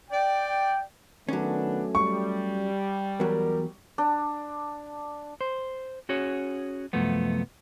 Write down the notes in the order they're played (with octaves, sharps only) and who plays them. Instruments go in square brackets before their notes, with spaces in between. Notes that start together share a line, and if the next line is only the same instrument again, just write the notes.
[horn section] D5 G5
[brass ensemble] D#3 B3 D4 [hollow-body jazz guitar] F#3 C#4 [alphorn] A3
[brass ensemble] G3 [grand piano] C#6
[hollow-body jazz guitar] E2 F#3 [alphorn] A#4
[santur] D4
[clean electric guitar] C5
C#4 F#4 G#4 C#5
C2 F#2 F3 A3 B3